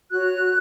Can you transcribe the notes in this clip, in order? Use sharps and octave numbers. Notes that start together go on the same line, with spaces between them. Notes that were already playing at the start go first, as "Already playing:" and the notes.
F#4 C#5 F#6